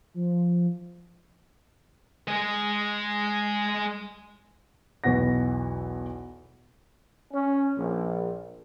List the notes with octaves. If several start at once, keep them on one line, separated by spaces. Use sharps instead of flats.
F3
G#3 D#5
B1 E2 B2 F#5 A#6
C#4
A#1